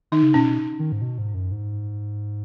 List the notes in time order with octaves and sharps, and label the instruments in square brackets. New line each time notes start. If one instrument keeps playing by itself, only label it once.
[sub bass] D#3 [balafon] D#4
[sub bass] C#3
[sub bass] B2 [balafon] C#4
[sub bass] D#3
G#2
B2
G#2
F#2
G#2